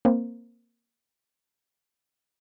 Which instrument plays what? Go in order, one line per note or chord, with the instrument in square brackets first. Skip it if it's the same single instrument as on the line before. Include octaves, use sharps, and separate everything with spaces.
[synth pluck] A#3 C4